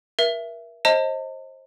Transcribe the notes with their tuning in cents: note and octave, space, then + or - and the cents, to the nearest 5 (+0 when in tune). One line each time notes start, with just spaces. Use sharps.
A#4 +35 E5 +15
C5 +30 D#5 +20 A5 +40